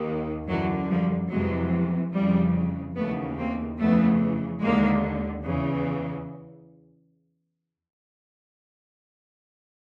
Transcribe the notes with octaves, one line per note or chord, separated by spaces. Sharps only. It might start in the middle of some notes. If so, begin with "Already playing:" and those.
Already playing: D#2 D#3
F#2 D3 E3 F#3
F3 G3
F2 C3 E3 F#3 G#3
F2 C#3 E3 F3 G3
D#2 C#3 E3 A3 B3
A#3 C4
F2 C#3 E3 A3 B3
D#2 D3 G#3 A#3
E2 C#3 E3